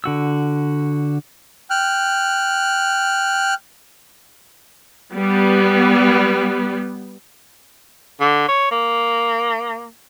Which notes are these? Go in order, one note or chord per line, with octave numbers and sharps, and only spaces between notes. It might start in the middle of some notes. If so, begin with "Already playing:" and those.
D3 F#4 E6
G5 F6 F#6
G3 B3
D3
C#5
A#3